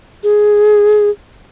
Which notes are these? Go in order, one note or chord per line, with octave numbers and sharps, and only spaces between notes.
G#4